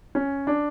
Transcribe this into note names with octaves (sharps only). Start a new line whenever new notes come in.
C#4
D4